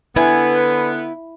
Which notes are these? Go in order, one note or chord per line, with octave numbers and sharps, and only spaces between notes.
D3 B3 E4 B4 G#5